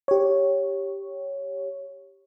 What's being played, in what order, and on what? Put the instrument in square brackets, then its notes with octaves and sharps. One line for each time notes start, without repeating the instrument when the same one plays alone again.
[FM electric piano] G4 C#5